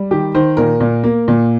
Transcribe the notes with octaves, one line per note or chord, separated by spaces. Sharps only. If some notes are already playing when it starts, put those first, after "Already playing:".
Already playing: G3
D#3 G4
D#3 C5
A#2 A#4
A#2
A#3
A#2